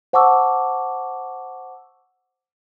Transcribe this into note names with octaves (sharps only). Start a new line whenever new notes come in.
C5 F#5 A5 C#6 D6 E6